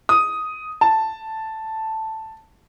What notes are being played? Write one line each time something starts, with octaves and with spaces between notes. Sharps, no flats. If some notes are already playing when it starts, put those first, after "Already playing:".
D#6
A5